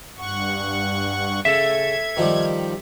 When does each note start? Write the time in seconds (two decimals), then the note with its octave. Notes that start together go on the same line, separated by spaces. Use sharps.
0.18 G2 F#5 C#6
1.45 C#3 A4 E5 G#6
2.17 D#3 F3 G3